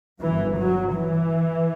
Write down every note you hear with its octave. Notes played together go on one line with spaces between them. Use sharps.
G1 F#2 E3
F#3
E3